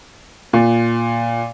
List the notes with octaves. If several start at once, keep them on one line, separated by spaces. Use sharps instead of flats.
A#2